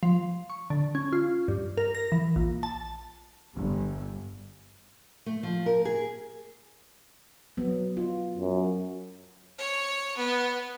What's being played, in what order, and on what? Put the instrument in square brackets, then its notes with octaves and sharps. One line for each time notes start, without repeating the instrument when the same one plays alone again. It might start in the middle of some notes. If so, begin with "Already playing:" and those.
[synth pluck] F3
C#6
D3
C#4
F4
G2
A#4
A#6
E3
A#1
A5
[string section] G1
[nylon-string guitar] A3
F3
A#4
G#4
[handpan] F#3 B3
F4
[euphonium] F#2
[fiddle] C#5
B3